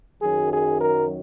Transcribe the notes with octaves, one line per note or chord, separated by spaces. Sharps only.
F#2 D#3 F#3 G#4
G#4
A#4